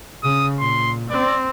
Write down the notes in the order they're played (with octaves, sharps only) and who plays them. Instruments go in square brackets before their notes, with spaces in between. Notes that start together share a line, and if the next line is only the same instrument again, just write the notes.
[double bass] C#3 [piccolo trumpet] D#6
[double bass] A#2 [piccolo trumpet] C6
[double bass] C4 [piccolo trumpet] D5